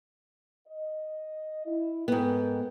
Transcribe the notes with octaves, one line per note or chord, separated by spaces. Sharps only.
D#5
E4
G#2 B3 A4 A#4 G5